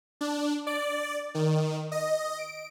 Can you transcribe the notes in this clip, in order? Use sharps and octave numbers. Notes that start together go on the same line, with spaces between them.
D4
D5
D#3
D#5
D7